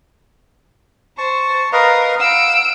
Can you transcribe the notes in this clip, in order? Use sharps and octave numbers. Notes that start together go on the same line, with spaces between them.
C5 A5 C#6
A#4 B4 D#5 F5
F5 F#5 E6 D7